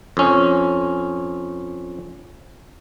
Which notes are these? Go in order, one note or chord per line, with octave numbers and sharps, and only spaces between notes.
F2 C#4